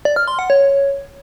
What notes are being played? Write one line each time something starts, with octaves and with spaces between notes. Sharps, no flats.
D5
F6
C6
F#5
C#5